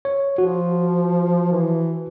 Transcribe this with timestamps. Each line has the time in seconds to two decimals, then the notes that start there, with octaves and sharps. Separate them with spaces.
0.05 C#5
0.38 F3 F#4
1.52 E3